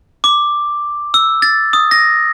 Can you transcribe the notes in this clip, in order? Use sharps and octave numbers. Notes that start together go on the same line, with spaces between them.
D6
E6
A6
D#6
A#6